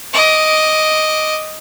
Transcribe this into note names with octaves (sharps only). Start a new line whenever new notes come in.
D#5 D6